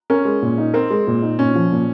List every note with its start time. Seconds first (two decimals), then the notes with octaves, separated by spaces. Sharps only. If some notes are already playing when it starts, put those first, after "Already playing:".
0.10 C#4 A#4
0.25 G#3
0.42 A#2
0.58 D#4
0.74 C4 A#4
0.90 G#3
1.07 A#2
1.22 D#4
1.39 A#2 C#4
1.55 F3
1.72 A#2